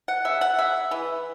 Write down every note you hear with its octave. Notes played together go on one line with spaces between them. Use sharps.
F#5
C#3 E5
F#5
C#3 E5
E3